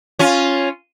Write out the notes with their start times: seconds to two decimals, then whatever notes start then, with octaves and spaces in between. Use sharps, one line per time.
0.19 C#4 F4